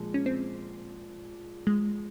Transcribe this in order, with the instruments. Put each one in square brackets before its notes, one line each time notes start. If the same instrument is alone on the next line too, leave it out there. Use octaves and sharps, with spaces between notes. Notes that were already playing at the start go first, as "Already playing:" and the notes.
Already playing: [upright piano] A#2 F3 G#3
[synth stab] C#4
C4
G#3